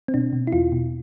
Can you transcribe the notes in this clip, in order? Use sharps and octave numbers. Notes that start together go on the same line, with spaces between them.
C4
B2 D4
B2
E4
E2 F4
B2